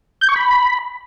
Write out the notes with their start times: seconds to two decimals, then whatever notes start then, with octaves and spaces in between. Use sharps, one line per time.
0.21 G6
0.29 C#6
0.36 B5